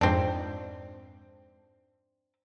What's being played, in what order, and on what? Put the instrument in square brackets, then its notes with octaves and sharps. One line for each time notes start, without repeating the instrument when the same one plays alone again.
[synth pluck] F2 G#2 [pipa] C4 D4